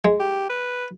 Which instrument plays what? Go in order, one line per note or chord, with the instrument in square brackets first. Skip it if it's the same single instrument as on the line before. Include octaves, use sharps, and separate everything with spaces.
[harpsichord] G#3
[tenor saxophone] G4
B4